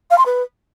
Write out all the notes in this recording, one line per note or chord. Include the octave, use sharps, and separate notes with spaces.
F5
C6
B4